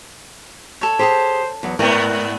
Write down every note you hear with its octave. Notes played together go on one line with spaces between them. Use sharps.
A4 C#5
G4 G#4 C5 A5
E2 F#3
G#2 B3 G4 A#4 D5 G#5